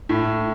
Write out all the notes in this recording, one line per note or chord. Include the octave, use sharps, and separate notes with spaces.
A2